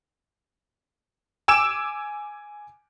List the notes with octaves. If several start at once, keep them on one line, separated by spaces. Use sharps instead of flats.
G#5 D6 E6 D7 E7